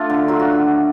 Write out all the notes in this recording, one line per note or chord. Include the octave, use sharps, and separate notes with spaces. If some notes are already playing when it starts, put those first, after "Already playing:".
Already playing: A3 D4 F4
D3
F#3 F4
F#4